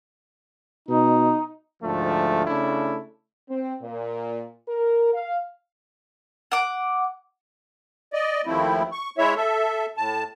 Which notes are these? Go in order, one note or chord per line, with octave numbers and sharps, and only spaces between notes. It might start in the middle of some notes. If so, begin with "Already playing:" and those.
B2 D#4
D2 G#2 F3 A3
C#3 A3 D4 E4
C4
A#2
A#4
F5
F#5 D6
D5 D#5
D#2 F3 A3 C4 E4
C#6
G#3 E4 C#5 E5
A4 E5
A2 A5